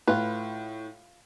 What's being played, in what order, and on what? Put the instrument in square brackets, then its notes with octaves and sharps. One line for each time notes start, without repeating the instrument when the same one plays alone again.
[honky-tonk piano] A2 [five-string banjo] F4 B4